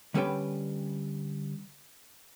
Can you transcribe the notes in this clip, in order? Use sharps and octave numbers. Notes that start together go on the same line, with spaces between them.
D3 G3 C#4 A4 B4 G5